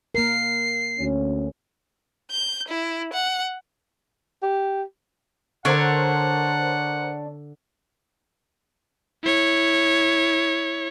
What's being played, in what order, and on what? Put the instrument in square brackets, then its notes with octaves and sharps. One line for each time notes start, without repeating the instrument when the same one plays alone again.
[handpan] A#3 A#4 [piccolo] C7
[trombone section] D2 C#4
[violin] G6
E4
F#5
[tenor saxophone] G4
[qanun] D3 [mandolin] D4 C#5 [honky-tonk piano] A#4 C5 C#6 [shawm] F#5
[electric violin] E4 C#5